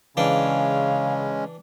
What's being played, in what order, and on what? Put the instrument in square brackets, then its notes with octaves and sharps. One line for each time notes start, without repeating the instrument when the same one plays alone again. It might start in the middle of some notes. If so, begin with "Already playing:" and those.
[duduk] C#3 [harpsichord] E3 D4 G5 [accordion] G#3 C#4 [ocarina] F5